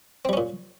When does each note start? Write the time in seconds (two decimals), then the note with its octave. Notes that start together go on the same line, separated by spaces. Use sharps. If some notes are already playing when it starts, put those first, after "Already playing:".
0.25 C4
0.29 G3
0.33 C#4
0.37 A#2